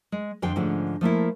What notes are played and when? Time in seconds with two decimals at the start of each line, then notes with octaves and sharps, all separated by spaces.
0.12 G#3
0.42 F2 D3 C5 G5
0.56 G#2 D3 F3 A3 C#4
1.01 F3 A3 A#3 E4